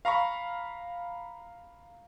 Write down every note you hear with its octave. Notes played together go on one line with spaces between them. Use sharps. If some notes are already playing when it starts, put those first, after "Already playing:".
F5 A#5 B5 C#6